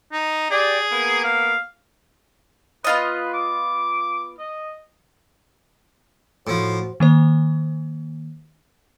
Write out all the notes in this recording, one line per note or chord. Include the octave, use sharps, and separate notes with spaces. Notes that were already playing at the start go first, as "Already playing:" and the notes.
D#4
G4 G#4 D5
A#3 B3
F5
B3 F4 B4 D#5
D6
D#5
A2 F3 F#4 C5
D#3 A#3 C5